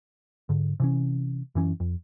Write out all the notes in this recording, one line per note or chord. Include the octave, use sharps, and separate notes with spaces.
G#2 D3
C3 E3 C#4
F#2 E3 C#4
F2